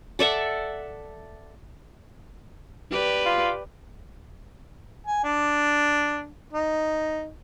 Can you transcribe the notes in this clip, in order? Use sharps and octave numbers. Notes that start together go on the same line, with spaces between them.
A4 D5 E5 F#5
G4 B4 D5
F4
G#5
D4
D#4